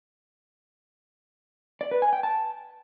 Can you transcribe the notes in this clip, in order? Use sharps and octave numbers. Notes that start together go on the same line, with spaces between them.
D5
B4
G#5
G5
A5